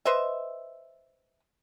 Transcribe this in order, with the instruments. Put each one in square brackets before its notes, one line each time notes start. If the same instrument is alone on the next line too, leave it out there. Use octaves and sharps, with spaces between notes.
[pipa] B4 C5 D#5 E5